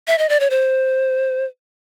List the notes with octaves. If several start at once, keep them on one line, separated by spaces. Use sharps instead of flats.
E5
D#5
D5
C#5
C5